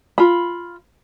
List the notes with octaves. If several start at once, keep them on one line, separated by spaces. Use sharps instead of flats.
F4 B5